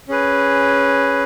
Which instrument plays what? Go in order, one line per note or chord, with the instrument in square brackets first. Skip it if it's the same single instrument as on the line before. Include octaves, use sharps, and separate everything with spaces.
[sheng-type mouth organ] C#4 G#4 B4